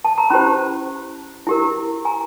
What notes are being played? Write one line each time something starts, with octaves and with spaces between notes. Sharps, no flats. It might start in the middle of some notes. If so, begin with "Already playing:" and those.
A5
A#5
C#4 E4 G4 C5 A5 B5
E4 G4 A#4
G#5 A#5